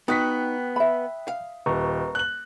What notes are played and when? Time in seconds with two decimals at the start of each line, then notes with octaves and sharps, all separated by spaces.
0.08 B3 D#4 F#4 G5 D#6 F#6 B6
0.76 E5 B5
1.28 F5
1.66 D#1 B4 A#5 C#6
2.15 F#6 F#7